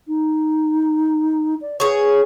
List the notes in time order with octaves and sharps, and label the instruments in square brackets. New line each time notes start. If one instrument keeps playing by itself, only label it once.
[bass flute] D#4
D5
[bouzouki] G#4 C#5 [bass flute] B4